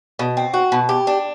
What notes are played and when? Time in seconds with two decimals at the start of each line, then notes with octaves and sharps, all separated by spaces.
0.19 B2
0.37 C4
0.54 F#4
0.72 B2
0.89 G4
1.07 D4